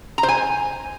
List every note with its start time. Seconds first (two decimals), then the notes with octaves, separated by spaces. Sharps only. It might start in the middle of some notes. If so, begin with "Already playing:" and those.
0.18 A#5
0.23 C5
0.28 G#5